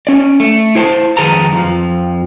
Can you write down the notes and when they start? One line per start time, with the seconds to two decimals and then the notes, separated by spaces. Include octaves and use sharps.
0.07 C#4 D5
0.40 A3
0.75 E4 C5 G#5 A5
1.17 F2 D#3 G#4 B4 A5 A#5
1.53 F2 F3